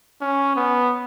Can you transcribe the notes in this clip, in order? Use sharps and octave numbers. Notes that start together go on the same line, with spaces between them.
C#4
B3